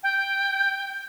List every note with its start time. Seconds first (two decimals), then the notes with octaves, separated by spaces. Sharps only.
0.03 G5